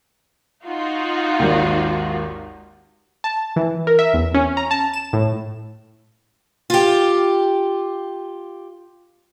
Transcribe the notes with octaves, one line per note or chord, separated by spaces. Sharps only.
D#4 F4 F#4
G#1 D#2
A5
E3
A#4
E5
E2
C#4
A#5
A5
E7
A2
F4 G4